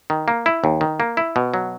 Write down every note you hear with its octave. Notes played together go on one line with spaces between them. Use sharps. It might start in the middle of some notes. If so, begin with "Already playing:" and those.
D#3
A#3
E4
D#2
D#3
A#3
E4
B2
F#3